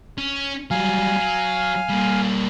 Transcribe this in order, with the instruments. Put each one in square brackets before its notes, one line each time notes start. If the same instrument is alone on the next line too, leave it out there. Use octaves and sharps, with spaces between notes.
[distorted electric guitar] C#4
[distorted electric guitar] F#3 G3 [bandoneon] F5 G#5 F6
[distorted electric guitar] F#3
G3 A#3